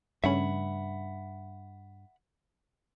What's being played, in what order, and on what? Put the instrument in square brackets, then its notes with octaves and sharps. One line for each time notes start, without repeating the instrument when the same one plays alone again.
[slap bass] G2 [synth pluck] C#3 A3 C#4 [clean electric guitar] E5 F#5 B5